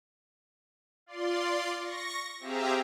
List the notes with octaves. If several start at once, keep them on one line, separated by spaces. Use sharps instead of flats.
F4 D5 C6
C#6 A#6
C4 G4 G#4 E5 F5 A#5